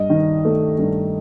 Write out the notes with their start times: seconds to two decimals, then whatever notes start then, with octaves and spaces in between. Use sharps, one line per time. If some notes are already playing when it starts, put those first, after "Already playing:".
Already playing: G2 D#5
0.10 D#3
0.45 A3
0.78 G2